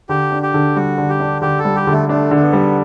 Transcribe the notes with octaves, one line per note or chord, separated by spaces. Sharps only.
D3 G4
D4
G4
D3
G3 F#4
D3
G4
D4
D3 G4
A4
G3
G4
D3 A3
A3 D4
D3 A3
B3
G3